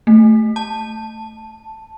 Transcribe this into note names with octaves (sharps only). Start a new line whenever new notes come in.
A3
A5